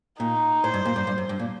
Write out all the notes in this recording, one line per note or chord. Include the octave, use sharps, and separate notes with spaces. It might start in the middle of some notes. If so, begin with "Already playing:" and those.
A#2 D#4
A2 C5
G2
A#2
G2
G2
F#2
G2
A#2